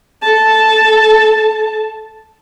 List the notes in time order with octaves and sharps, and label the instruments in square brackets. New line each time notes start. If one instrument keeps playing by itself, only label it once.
[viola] A4 A5